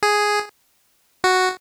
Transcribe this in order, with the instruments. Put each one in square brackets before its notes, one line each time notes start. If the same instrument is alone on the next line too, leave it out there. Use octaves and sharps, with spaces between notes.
[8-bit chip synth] G#4
F#4